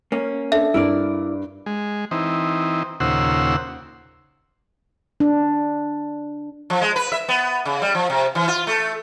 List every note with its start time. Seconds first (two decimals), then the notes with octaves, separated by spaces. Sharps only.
0.12 A#3 C#4
0.52 D4 A4 E5
0.74 G2 E4 A#4 D5
1.66 G#3
2.11 E3 C4 D#4
3.00 D#2 A#2 C#3 C5 F#5 E6
5.20 D4
6.70 F3
6.81 G#3
6.96 B4
7.12 E5
7.28 B3
7.65 C#3
7.82 G3
7.95 F3
8.10 C3
8.35 E3
8.48 F4
8.67 A3